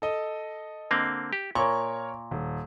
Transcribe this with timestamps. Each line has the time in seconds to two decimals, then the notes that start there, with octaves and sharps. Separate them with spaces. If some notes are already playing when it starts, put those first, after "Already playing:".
0.02 A4 D#5
0.91 D3 A#3 C4
1.33 G4
1.55 A#2 A#4 C#5 C#6
2.31 D#1